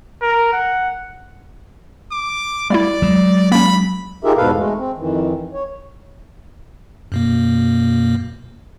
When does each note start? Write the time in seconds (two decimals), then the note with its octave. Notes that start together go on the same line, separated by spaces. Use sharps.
0.22 A#4
0.53 F#5
2.11 D6
2.70 G3 A3 E4 D5
3.02 F#3 G#3
3.52 A#3 C#4 B5
4.24 D#4 F4 G4 G#4 A#4 E5
4.37 E2 G#2 B2 A4 B4 F5
4.56 G#3 A3
4.78 C4
4.98 F2 D#3 E3
5.53 C#5
7.12 F#2 B2 A#3